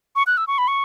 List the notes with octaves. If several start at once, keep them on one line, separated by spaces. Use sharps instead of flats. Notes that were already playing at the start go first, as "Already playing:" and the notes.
C#6
F#6
E6
C#6
B5
C#6